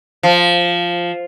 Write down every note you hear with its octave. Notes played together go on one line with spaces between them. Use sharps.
F3